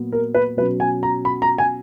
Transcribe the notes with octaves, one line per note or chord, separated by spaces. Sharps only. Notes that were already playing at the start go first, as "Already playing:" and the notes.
Already playing: A#2 F#3 B3
A#4
B4
B2 F#3 C#4 B4
G#5
A#5
B5
A#5
G#5